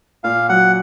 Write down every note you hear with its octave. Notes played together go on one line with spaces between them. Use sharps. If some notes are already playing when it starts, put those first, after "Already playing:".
A#2 F5
F#3 F#5